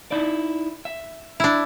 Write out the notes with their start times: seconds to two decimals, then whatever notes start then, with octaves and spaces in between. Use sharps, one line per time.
0.11 D#4 E4 D5
0.85 E5
1.40 D4 E4